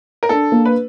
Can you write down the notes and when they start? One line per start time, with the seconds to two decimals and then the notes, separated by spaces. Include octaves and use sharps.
0.23 A#4
0.29 D4 A4
0.52 A#3
0.65 B4